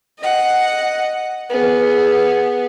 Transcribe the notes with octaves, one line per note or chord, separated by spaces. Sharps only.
D#5 F#5
B3 G#4